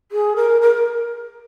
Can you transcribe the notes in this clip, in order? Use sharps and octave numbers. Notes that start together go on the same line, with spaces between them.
G#4
A#4
A#4